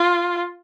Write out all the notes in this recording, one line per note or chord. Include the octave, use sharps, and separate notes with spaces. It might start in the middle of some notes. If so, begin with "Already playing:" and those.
Already playing: F4